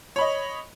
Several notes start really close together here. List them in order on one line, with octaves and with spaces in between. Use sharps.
C#5 B5 D#5